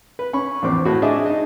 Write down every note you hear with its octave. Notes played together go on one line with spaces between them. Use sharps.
B4
C#4 B5 C#6
A#1 E2 C4 D6
A2 F#4
D4 G#4 D#5 E5
D#4 D#5